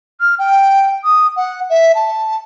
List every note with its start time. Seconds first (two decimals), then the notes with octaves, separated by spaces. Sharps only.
0.21 F6
0.39 G5
1.04 D#6
1.36 F#5
1.70 E5
1.95 A5